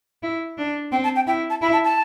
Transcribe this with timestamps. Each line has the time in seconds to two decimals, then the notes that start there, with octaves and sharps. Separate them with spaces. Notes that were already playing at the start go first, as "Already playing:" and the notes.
0.23 E4
0.58 D4
0.92 C4 G5
1.04 A5
1.16 G5
1.27 E4 G5
1.50 A5
1.62 E4 B5
1.73 A5
1.84 A5